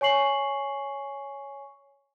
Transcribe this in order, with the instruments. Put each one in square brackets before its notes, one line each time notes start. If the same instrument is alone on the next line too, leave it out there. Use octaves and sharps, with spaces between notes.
[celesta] C#5 G#5 C#6 C7 F#7